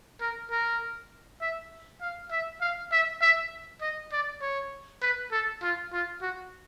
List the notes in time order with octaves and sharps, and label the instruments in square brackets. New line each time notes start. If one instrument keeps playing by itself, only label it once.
[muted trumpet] A#4
A#4
E5
F5
E5
F5
E5
E5
D#5
D5
C#5
B4
A4
F4
F4
F#4